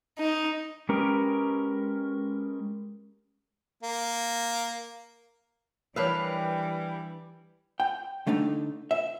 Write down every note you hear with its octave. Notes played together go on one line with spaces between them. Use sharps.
D#4
G#3 C#4 G4 A#4 B4
A#3
E3 G3 D4 A#4 B4 C#5 F5
G5
D3 A3 D4 D#4
E5